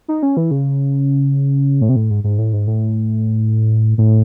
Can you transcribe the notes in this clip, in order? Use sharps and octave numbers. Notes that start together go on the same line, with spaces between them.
D#4
C#4
E3
C#3
A2
C3
A2
G#2
G#2
A2
G#2
A2
A2